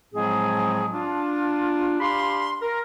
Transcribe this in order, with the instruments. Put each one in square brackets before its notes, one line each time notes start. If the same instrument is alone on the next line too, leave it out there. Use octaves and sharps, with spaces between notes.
[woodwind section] A2 F3 F#3 G#3 C4 G#4
D4 F4
D4 G4 F5 B5 C6
A#4